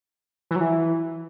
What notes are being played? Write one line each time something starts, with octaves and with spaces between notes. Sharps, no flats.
E3
F#3
E3